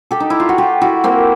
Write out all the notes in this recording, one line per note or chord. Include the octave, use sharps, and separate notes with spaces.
G4 A4
D#4
E4
F4
F#4
F4 G4
E4 F#4
A#3 C4